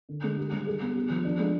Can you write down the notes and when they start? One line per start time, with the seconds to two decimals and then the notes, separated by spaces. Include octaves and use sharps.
0.09 D3
0.23 G#3
0.38 G4
0.52 G3
0.67 G#4
0.82 B3
0.96 G4
1.10 F3
1.25 D4
1.39 G#3